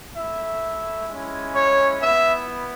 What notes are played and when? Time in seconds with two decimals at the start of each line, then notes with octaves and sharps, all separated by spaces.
0.16 A3 E4 E5
1.08 G#3 C#4 E4
1.55 C#5
2.01 B3 E4 E5